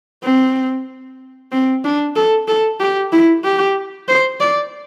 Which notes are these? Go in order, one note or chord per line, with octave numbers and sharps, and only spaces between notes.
C4
C4
D4
A4
A4
G4
E4
G4
C5
D5